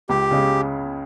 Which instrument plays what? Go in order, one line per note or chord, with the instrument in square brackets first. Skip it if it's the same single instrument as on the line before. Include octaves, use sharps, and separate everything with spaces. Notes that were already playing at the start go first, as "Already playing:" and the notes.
[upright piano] C#2 [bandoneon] G4
[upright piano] C#3 G#3